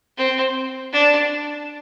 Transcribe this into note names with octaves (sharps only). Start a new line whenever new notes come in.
C4
D4